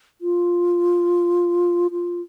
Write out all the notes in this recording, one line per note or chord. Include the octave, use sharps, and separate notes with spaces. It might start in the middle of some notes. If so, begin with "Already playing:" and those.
F4
F4